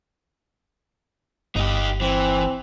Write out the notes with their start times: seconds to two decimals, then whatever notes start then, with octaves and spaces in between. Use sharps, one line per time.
1.56 G1 D#4 G4
2.01 E3 C4